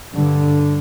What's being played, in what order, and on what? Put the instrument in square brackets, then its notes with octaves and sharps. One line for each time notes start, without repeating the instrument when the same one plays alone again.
[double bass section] G2 D3